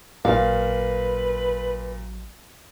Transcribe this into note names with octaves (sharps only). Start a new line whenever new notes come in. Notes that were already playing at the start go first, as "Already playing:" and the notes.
A1 A#2 F#3 B4 F5